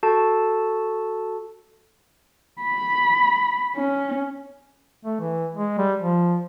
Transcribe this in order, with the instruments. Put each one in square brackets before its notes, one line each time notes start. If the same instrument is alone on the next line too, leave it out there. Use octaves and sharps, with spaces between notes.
[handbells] F#4 A4 A5
[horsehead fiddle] B5
C#4
[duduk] A3
E3
G#3
G3
F3